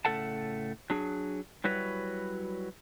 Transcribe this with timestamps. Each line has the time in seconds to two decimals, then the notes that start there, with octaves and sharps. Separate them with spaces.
0.05 A2 C#3 A3 A4 F#5 A5
0.90 F#3 D4 G#4
1.64 F#3 G3 E4 F#4 B4 C#5